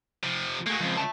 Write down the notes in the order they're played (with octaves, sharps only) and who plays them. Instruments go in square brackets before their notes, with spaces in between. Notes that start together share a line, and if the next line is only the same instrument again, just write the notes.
[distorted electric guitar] C3 F3
[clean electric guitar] A3 G#4 [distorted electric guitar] A#3 F#4
[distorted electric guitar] C#2 [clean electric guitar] F3 G#3 C4
[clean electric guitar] E5 A5